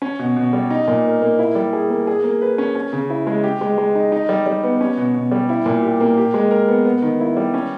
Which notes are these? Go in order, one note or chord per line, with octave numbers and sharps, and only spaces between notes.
C#4
B2
B2
G3
D#4
A#2
A#4
A#3
E4
G3
G#4
A#3
G#4
A#3
B4
C#4
C#4
C#3
E4
G#3
G4
G#3
G#3
D#4
D#4
G3
G3
B3
C#4
B2
B2
G3
E4
A#2
G4
A#3
G4
G#3
A#4
B3
B3
D#3
E4
G3
C#4